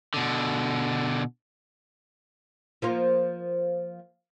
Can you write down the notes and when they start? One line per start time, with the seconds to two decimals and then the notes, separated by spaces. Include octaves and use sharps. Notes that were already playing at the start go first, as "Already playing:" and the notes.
0.14 B2 D3
2.82 F3 A#3 F4